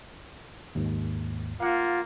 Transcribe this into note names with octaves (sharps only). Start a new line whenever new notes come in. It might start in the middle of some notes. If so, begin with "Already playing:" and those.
D#2 G#2
A#3 F4 F5 F#5